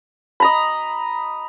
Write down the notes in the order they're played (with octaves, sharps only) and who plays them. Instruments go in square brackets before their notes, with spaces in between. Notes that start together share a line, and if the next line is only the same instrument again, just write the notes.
[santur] D#5 A#5 B5